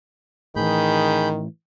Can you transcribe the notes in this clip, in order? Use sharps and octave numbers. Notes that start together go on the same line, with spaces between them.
A2 D#3 E3 G#4 B5 G6